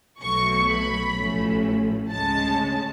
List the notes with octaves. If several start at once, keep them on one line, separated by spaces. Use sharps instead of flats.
B1 B2 F#3 A3 C#6
B5
A1 A2 F3 A3 C#4
D2 C#3 G#3 C#4 A5